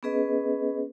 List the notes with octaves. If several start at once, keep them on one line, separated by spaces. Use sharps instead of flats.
B3 C#4 G#4 B4 D#5